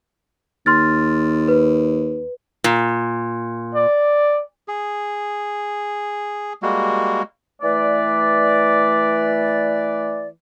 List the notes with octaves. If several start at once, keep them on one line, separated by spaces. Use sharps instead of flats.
D#2 C6 F6 A6
B4
A#2
D5
G#4
G3 G#3 A#3 F#4
E3 A3 B4 D5